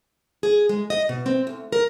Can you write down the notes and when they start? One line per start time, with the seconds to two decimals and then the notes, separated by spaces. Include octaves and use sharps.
0.43 G#4
0.69 G#3
0.90 D#5
1.09 B2
1.26 C4
1.47 D2
1.72 A#4